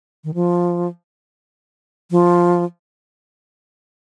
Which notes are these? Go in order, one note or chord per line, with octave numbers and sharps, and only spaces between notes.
D#3
F3
F3